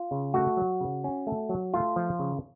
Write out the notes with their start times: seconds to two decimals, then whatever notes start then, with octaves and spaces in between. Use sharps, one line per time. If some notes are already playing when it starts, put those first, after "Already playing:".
Already playing: F4
0.11 C#3
0.34 A3 F#4
0.57 F#3
0.81 C#3
1.04 C#4
1.27 A3
1.49 F#3
1.74 A3 F4
1.96 F3
2.19 C#3